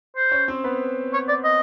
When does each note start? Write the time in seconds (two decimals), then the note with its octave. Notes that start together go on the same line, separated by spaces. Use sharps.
0.16 C5
0.32 C#4 C#5
0.48 C4 C5
0.64 B3 B4
1.13 C#5
1.28 D5
1.44 D#5